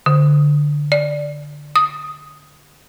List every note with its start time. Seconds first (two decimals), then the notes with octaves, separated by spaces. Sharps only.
0.06 D3
0.92 D5
1.76 D#6